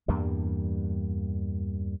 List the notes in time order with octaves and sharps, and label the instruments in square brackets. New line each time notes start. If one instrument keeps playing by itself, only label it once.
[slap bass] E2 G2 G3 A#3